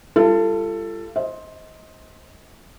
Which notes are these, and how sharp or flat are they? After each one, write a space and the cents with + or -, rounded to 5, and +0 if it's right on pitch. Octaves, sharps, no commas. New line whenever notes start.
G3 +20 F4 -35 A4 +15
C5 +10 D#5 +25